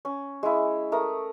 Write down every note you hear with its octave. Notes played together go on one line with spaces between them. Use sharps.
C#4
G#3 E4
A3 A#4 D#6